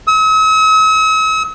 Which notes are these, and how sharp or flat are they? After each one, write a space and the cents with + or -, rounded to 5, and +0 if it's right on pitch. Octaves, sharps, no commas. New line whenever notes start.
E6 -45